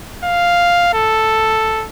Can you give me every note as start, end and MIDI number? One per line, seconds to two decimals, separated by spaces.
0.24 0.91 77
0.94 1.86 69